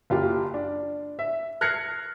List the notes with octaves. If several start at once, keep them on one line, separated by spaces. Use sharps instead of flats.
F#1 F4 G4
D4
E5
F6 F#6 G#6 A#6 C7 C#7